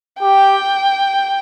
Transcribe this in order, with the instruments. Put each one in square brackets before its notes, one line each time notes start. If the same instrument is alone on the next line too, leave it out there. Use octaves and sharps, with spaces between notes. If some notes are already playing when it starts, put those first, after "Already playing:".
[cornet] G4 [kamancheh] G5